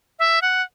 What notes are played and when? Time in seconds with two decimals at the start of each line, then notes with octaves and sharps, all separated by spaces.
0.19 E5
0.42 F#5